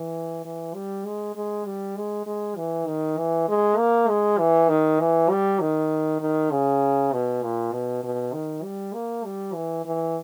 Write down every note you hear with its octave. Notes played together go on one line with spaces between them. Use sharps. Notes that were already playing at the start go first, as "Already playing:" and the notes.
Already playing: E3
E3
G3
G#3
G#3
G3
G#3
G#3
E3
D#3
E3
G#3
A#3
G#3
E3
D#3
E3
G3
D#3
D#3
C#3
B2
A#2
B2
B2
D#3
G3
A#3
G3
E3
E3